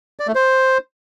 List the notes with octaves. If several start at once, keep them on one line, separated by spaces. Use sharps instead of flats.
D5
A3
C5